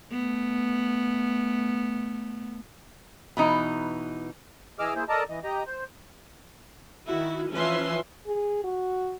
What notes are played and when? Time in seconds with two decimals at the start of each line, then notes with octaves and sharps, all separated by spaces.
0.12 A3 B3
3.37 B2 E3 D#4
4.79 E3 G#4 D#5 D6 E6 F6
4.95 A#3 E4 G#4 C5
5.09 A4 A#4 D5 D#5 A5 A#5
5.29 E3 D#5
5.43 G4 D#5 A#5
5.67 C5
7.08 D#3 E4 F#4
7.53 E3 F3 C#4 B4 E5 C6
8.26 G#4
8.64 F#4